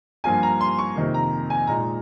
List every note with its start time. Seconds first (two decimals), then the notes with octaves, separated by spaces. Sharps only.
0.24 G2 F3 A#3 F4 G#5
0.43 A#5
0.61 C6
0.79 C#6
0.96 F2 C3 D#3 A#3
1.14 A#5
1.50 G#5
1.67 A#2 G#3 D#4 A#5